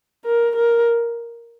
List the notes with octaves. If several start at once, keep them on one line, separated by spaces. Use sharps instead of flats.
A#4
A#4